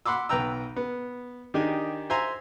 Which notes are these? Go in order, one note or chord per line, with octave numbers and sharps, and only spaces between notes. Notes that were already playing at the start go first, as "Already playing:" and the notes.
F#5 B5 C6 D6 E6
B1 B4 G5 A#5 E6
B3
D#3 D4 D#4 G4 G#4 G#5
C5 E5 G#5 A#5 C6